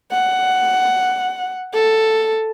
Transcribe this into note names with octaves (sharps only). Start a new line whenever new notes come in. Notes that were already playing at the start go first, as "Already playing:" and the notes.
F#5
A4